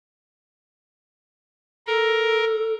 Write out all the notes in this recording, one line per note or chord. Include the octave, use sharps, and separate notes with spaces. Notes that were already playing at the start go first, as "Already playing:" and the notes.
A4 A#4